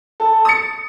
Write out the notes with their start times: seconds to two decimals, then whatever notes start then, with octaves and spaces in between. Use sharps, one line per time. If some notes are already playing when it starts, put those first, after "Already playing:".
0.20 A4
0.45 D#6 A6 C#7